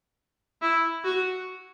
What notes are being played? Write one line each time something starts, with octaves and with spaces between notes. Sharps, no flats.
E4
F#4